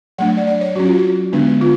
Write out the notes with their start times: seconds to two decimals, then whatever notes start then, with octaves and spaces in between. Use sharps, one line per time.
0.18 F#3 A3 D4 F#5
0.37 D5
0.47 D5
0.61 C#5
0.76 F#3 F#4
0.79 C#4
0.85 F4
0.95 F#4
1.32 D3 G#3 B3 D4
1.61 F4